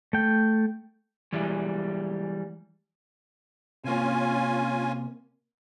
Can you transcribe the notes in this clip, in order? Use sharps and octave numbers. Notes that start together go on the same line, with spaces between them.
A3 G5
E3 G3 G#3
C3 A#3 C#4 F4 G#5